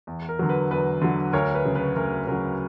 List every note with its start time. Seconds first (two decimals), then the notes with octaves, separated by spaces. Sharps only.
0.07 E2
0.29 A#4
0.39 D3 F#3
0.49 B4
0.71 E2 B4
1.01 D3 F#3
1.33 D2 A#4 C#5
1.55 B4
1.65 C#3 F#3
1.75 B4
1.96 D2 A#4
2.27 C#3 F#3 A#4